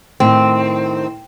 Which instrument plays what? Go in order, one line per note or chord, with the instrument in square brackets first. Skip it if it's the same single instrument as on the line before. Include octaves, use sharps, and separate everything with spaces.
[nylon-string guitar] A2 D#3 [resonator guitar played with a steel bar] C4